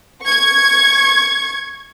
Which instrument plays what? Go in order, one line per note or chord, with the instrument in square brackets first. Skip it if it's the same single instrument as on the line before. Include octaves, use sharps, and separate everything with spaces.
[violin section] C#6 G#6